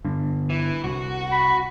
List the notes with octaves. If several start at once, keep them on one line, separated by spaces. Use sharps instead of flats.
G2 D3
E3
C2 F#4
B5